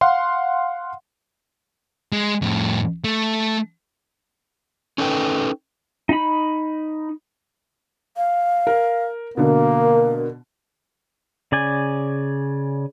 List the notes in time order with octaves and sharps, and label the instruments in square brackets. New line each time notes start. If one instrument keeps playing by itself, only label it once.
[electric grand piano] F5 F#5 C6
[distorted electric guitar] G#3
F2 A2
A3
[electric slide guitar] C#4 D#4 A4 B4 G5
[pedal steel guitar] D#4 B5
[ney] F5
[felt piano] A#4
[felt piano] B2 D3 [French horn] A#3 [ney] A#4
[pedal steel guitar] C#3 D5 G#5